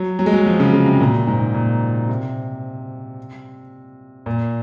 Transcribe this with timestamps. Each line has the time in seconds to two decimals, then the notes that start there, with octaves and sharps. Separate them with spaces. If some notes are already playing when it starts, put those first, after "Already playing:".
Already playing: F#3
0.19 F#3
0.26 G#3
0.33 F#3
0.46 F3
0.60 C#3
0.73 C#3
0.86 C3
1.00 A#2
1.27 G#2
1.54 A#2
2.09 C3
4.26 A#2